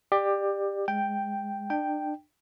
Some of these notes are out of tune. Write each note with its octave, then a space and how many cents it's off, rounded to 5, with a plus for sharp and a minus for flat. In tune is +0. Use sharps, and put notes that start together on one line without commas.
G4 +15 D5 +25
G#3 -5 G5 +0
D4 +35 G5 +0